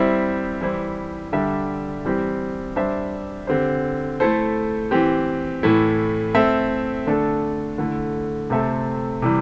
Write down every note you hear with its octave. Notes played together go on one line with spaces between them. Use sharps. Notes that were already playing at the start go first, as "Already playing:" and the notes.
Already playing: G3 C4 E4 C5 E5
E3 G3 E4 C5
D3 G3 D4 G4 E5
E3 G3 C4 G4
G3 D4 C5 E5
D3 C4 G4 C5
A3 E4 A4 C5
E3 C4 G4
A2 E3 A3 E4
A3 C4 A4 E5
D3 A3 D4 A4
D3 A3 E4
C3 A3 C4 A4 E5
C3 E3 G3